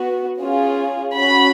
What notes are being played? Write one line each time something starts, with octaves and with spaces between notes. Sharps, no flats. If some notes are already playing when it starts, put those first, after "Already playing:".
Already playing: B3 F#4
C#4 F4 G#4
C#4 F#4 B5